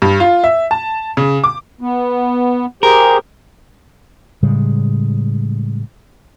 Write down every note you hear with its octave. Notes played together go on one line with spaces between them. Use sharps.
G2
F4
E5
A5
C#3
D6
B3
G4 G#4 A#4 C5
A2 C#3 G3 G#3